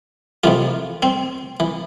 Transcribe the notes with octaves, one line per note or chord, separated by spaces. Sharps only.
F2 C3 E3 F4
C4
E3